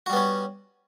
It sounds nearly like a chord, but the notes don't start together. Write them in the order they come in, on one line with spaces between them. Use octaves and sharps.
F#4 G3 B3 C#4